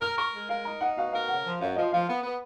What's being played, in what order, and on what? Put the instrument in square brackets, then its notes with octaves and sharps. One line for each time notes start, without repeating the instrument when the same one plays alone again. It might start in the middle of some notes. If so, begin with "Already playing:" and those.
[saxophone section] A#4 [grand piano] F6
[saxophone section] A#4 [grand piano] C#6
[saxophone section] G#3
[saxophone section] A#4 [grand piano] F5
[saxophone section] D#4 [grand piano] A#5
[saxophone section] D#4 [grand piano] F#5
[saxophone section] B2 [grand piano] F5
[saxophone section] A#4 [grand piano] F5
[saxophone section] C#3 [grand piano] F#5
[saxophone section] F3
[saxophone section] F#2 [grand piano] F5
[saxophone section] F3 [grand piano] D#5
[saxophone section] F3 [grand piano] F5
[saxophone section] B3
B3